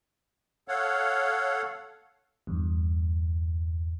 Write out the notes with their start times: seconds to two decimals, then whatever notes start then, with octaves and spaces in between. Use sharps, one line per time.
0.68 A4 C#5 F5 F#5
2.47 E2 G2